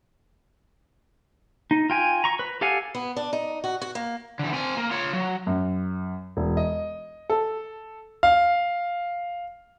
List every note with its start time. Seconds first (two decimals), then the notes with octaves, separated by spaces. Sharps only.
1.71 D#4
1.90 F4 G5 G#5
2.24 A#5 C#6
2.39 B4
2.61 G4 A4 F5 F#5 G#5
2.95 B3
3.16 D4
3.33 D#4
3.64 F#4
3.81 F#4
3.95 A#3
4.39 D3 E3
4.53 C4 G#5
4.77 A#3
4.91 F4 C#5
5.13 F#3
5.47 F#2
6.37 E1
6.57 D#5
7.30 A4
8.23 F5